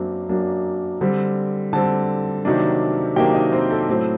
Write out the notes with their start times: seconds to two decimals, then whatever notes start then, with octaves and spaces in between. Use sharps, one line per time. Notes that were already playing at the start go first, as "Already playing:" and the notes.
Already playing: F#2 F#3 A#3 C4 D4
0.29 F#2 F#3 A#3 D4
1.01 D3 G3 C4
1.73 D3 G3 C4 A4 A5
2.45 C3 D#3 F#3 A#3 D4
3.16 C3 D#3 F#3 A#3 D4 G4 G5
3.34 D#4 D#5
3.52 C4 C5
3.71 A4
3.89 A2 F#3 C4